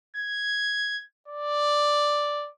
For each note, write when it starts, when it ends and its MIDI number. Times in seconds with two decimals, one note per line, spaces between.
0.16 1.01 92
1.28 2.49 74